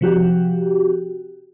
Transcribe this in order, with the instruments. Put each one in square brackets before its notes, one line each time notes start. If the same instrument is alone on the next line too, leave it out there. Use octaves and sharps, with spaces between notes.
[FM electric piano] C3 F3 F#4 G4